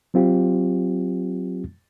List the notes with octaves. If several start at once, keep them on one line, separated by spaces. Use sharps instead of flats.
F#3 C4 F4 G4